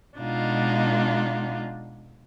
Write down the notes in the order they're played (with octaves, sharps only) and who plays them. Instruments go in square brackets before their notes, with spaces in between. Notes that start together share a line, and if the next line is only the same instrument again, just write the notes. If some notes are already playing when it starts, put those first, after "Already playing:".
[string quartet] B2 G#3 D4 D#4 F4